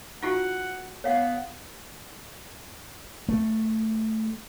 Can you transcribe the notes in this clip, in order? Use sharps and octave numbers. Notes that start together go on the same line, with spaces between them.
D#4 F4 F#4 F#5
B3 C#5 F5 F#5
A3